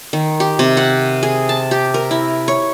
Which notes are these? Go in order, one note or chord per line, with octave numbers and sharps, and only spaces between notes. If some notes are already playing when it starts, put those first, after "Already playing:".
D#3
G4
C3
F#5
G#4
A5
G4
A#4
E4
C#5